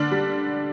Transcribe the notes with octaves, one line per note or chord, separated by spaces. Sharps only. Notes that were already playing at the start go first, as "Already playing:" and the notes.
Already playing: D3 D4 F6
G3